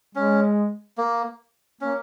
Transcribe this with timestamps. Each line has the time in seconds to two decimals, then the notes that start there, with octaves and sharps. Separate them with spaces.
0.15 G#3 C#4
0.98 A#3
1.81 A#3 C#4